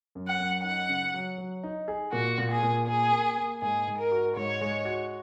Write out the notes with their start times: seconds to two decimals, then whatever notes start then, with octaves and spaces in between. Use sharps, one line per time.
0.15 F#2
0.27 F#5
0.40 F#2
0.64 D#4 F#5
0.89 C#3
1.14 F#3
1.38 F#3
1.63 D#4
1.88 G#4
2.13 A#2 F#4
2.38 A#2
2.50 G#4
2.63 A#2
2.87 A#3 G#4
3.12 A#3
3.38 A#3
3.62 G#2 G#4
3.87 G#2
3.99 A#4
4.12 F#4
4.36 G#2 C#5
4.61 G#3
4.85 F#4